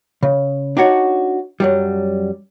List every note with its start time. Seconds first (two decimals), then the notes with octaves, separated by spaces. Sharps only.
0.23 C#3
0.77 D4 D#4 F#4 C#5
1.60 F#2 F#3 G3